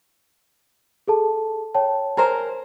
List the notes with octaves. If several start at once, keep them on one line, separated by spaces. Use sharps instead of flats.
G#4 A4 A5
C#5 G5 A5
G#4 A#4 C5